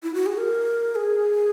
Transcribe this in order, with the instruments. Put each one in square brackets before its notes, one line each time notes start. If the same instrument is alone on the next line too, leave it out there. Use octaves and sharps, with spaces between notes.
[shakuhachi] E4
F#4
G#4
A#4
G#4